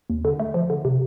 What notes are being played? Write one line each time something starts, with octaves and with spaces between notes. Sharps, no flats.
D#2
D3
A3
F3
D3
C3